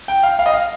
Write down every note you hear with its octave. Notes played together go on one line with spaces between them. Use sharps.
G5
F5
F5
D#5
F5